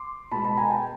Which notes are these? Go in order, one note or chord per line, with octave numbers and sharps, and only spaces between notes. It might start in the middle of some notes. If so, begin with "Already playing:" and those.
Already playing: C6 D6
B2 G#3 A5 B5
A5 B5
G#5 A#5
G5 A5